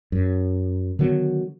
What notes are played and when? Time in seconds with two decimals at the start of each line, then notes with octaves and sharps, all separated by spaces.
0.12 F#2
0.99 D3 D#3 F#3 B3